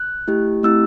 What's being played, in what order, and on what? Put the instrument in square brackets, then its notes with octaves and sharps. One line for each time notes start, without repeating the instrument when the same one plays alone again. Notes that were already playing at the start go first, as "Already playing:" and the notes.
Already playing: [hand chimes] F#6
A3 E4 G4
A3 C4 E4 G4 E6